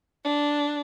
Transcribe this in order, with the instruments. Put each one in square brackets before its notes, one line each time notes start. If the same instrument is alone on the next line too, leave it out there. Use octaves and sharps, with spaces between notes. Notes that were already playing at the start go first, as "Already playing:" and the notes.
[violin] D4